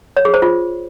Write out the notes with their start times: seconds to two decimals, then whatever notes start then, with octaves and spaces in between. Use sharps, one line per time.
0.17 C#5
0.25 G#4
0.34 C5
0.42 F4